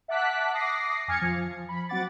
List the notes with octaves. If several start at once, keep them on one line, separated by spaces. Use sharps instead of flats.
E5 F#5 A5 D6 F#6 B6
D6 D#6 A#6 C7
F2 G#5 F6 G#6 A6 C#7
F3
B5
F#3 C4 F#5 D6 A6